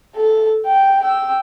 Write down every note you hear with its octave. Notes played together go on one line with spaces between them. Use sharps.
A4
G5
G5 E6